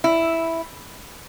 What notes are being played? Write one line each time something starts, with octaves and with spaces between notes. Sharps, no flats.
E4